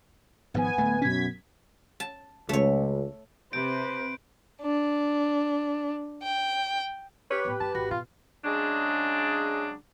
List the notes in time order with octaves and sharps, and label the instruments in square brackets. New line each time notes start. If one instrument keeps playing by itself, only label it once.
[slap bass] G#1 G#2 F3 [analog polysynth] B3 G#5
[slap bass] D1 A3
[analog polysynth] F#2 G#6 B6 [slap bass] B2 C#4
[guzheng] A5
[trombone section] C#2 [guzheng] A3 C#5
[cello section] C3 [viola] B4 C5 [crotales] G6 D7
[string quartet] D4
G5
[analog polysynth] G4 B4 [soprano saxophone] C#5
[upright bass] A2 B3
[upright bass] G2 [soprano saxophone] A5
[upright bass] G#1 [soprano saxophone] F#4
[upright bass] B2 [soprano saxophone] F4
[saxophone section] C#3 F#3 G#3 D4